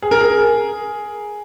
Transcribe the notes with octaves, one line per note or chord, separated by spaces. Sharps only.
G#4
A#4
G#4